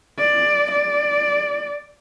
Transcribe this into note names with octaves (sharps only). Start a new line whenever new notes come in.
D5
D5